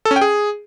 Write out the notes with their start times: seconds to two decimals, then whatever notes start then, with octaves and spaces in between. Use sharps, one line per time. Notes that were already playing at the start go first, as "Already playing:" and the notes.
0.05 A4
0.11 C#4
0.16 G5
0.21 G#4